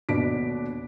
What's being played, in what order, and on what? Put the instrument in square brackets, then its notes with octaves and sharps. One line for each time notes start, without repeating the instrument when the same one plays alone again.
[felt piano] D#1 B2 D4 D5 B6 D7